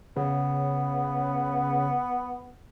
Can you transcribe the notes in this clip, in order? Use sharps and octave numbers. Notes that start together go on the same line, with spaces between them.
C#3 B3